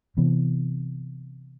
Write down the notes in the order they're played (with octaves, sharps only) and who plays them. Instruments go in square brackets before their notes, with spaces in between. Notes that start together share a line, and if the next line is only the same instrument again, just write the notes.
[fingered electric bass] C3 E3 B3